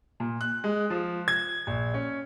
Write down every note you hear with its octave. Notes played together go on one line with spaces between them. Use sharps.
A#2
F#6
G#3
F3
G#6
A#1
C#4